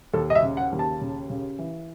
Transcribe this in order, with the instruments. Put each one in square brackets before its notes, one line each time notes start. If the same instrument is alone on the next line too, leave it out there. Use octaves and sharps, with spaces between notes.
[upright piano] D#2 A4
D#5
E5
C#3
F#5
D#2
A5
C#3
C#3
E3